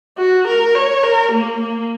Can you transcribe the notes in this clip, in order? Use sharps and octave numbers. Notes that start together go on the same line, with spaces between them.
F#4
A#4
C#5
A#4
A#3
A#3